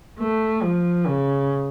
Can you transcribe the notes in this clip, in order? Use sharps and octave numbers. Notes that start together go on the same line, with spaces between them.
A3
F3
C#3